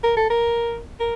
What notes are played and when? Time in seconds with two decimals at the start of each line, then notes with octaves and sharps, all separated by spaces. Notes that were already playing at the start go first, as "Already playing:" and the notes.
0.03 A#4
0.16 A4
0.30 A#4
1.00 A#4